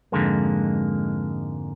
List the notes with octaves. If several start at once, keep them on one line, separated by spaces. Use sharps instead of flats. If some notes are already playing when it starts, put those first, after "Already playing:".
F2 G#2 D3 G#3 A#3